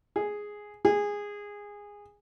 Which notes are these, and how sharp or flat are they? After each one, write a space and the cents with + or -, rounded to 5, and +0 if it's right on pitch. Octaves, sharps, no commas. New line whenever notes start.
G#4 +0
G#4 -15